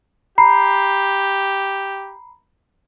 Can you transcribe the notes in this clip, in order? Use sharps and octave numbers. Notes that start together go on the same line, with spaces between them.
G4 A#5 B5 C7